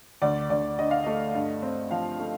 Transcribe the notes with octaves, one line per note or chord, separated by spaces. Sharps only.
D2 D5
D2 D5
D3 D#5
F5
A3 D#5
G2
C4
F3 F5
A3